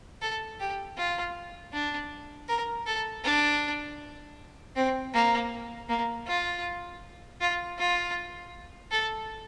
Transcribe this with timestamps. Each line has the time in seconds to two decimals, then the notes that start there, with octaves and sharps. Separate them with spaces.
0.22 A4
0.60 G4
0.98 F4
1.73 D4
2.48 A#4
2.86 A4
3.24 D4
4.76 C4
5.14 A#3
5.89 A#3
6.27 F4
7.41 F4
7.78 F4
8.92 A4